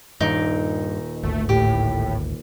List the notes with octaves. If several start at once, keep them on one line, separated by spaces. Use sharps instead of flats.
D#1 G2 D#4 D7
G#1 D2 A3
A2 G4